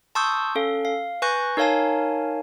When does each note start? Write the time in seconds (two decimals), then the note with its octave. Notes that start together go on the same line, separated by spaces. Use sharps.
0.15 A5 C6 C#6 D#6 E6 G6
0.55 C#4 A4 F5
0.85 F5
1.22 B4 G#5 C#6 F#6 G6 A#6
1.57 D#4 A#4 C#5 F5 G#5 A5